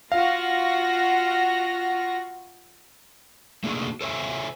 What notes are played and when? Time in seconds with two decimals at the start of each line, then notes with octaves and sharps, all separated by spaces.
0.12 F4 F#4 F5 A#6
3.64 A3 A#3 D4 D#4 F#4 G#4
4.01 A4 C5 C#5 E5 G#5